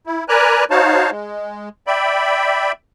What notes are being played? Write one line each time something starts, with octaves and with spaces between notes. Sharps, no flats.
E4
A#4 B4 D5 G#5 A#5 F#6
D#4 F#4 C5 C#5 F5 A5
G#3
D5 E5 G5 B5